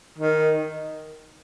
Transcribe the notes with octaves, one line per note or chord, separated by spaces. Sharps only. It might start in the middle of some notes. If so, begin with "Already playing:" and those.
D#3